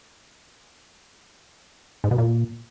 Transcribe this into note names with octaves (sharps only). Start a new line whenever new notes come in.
G#2
B2
A#2